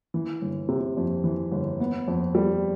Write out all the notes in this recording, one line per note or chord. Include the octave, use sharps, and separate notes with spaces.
E3
G1
C3
F2
E3
G1
B3
F2
G3